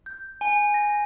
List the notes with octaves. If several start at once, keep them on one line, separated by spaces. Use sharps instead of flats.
G6
G#5
A#6